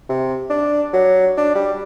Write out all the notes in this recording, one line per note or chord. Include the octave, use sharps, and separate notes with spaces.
C3
D4
F#3
D4
G3